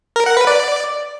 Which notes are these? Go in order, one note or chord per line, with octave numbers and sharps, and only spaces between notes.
A#4
F#5
B4
D5